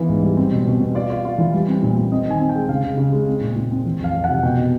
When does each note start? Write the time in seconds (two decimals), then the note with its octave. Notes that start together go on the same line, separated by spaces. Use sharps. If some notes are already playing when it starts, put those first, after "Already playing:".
Already playing: E3 B3 F4
0.09 G#2
0.23 G3
0.37 C4
0.52 B2
0.67 B2
0.80 B2
0.95 F4 D5
1.10 F4
1.25 F4
1.38 E3
1.53 G3
1.68 C4
1.83 A#2
1.97 A#2
2.12 C4 D#5
2.26 D#3 G#5
2.40 C4
2.49 G5
2.55 G#3
2.69 C#3 F5
2.84 C#3
2.97 C#3
3.12 G#3
3.27 C4
3.41 A#2
3.56 A#2
3.71 C4
3.86 E3
4.00 F2 F5
4.14 F2
4.24 F#5
4.29 C3
4.43 B2 G5
4.57 B2